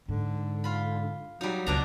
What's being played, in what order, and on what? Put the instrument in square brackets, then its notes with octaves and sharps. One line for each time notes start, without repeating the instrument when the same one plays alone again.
[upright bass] G#2 [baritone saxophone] D3
[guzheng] F4 B5
[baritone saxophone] F#3 [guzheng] G3 D#4
[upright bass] C#2 [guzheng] B2 D4 A#5